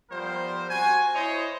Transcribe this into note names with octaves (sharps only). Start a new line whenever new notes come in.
F3 G3 B3 A#4 C5
C4 F#4 G#5
E4 C5 C#5 D#5